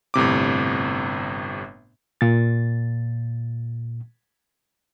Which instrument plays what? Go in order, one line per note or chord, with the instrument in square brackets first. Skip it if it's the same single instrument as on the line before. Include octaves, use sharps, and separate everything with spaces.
[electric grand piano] G1 A2 C3 D6
[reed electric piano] A#2 A6